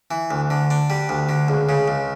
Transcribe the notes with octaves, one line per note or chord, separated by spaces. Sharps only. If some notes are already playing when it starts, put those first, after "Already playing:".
E3
D2
D3
D4
G3
D2
D3
C#2
C#3
C#2